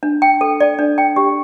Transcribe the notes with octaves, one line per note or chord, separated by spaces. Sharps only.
D4
G5
A4
D5
D4
G5
G4